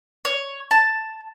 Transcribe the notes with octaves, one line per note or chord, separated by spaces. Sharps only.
C#5
A5